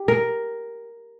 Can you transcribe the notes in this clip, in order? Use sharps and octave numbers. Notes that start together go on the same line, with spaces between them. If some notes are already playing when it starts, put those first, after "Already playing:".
Already playing: G4
A#4